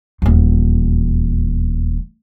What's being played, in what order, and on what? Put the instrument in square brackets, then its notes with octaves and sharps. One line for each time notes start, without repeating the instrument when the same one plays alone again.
[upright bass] D#1 E2